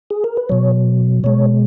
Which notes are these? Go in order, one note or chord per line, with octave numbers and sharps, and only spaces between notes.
G#4
A#4
B4
B2 F#3 C#5
B2 G#3 C#5